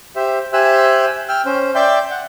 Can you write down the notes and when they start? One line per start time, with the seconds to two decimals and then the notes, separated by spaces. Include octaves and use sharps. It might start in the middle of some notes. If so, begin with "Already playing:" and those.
0.16 G4 C5 E5
0.53 G4 C5 E5 G#5 E6 F#6
1.29 G5 E6 F6
1.46 C#4 C5
1.75 D5 E5 G5 C6 G6
2.11 F#5